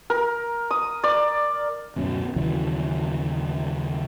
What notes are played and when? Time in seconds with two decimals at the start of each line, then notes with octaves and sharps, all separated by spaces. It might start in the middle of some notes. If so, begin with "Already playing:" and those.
0.10 A#4
0.71 D#6
1.04 D5
1.96 D1 F#2 B2 C#4
2.36 D#2 C#3 E3 F#3